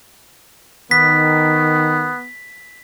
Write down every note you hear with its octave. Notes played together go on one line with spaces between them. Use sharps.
D#3 B3 B6